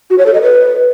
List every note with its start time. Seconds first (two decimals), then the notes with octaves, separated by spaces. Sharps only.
0.10 F#4
0.18 C#5
0.26 A4
0.34 D#5
0.42 B4